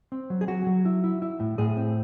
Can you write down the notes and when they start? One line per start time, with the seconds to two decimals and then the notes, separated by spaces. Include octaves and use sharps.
0.12 C4
0.30 F#3
0.41 G#4
0.48 F#3 F#4
0.67 F#3
0.85 E4
1.04 E4
1.22 E4
1.40 A2
1.58 A2 G#4
1.77 C4